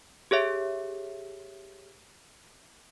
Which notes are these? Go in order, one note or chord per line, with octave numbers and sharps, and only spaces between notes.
G4 G#4 C#5 E5